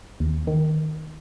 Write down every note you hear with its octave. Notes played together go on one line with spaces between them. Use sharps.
D#2
D#3